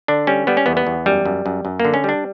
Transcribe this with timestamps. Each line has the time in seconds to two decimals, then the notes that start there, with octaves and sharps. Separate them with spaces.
0.08 D3 D4
0.27 G3 C#4
0.47 G3 B3
0.57 C#4
0.66 E2 B3
0.77 B3
0.87 E2
1.06 F#2 G3
1.25 F#2
1.46 F#2
1.65 F#2
1.80 A#3
1.85 D3
1.94 C#4
2.04 G3 D4